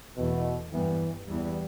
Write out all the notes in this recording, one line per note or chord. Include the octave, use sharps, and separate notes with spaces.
E2 B2 E3 A3
G2 E3 G3 B3
E2 E3 G3 B3